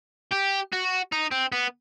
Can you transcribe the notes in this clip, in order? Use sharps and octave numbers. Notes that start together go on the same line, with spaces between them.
G4
F#4
D#4
C4
B3